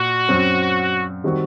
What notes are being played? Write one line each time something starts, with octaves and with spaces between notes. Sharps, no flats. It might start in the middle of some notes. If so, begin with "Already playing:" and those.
Already playing: A#2 F#4
F#2 F#3 C4
D#3 G3 C4 F#4